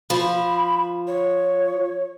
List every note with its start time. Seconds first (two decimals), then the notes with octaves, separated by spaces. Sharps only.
0.10 F3 B5
1.07 C#5